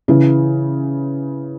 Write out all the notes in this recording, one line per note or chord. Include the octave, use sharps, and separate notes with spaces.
C#3 E3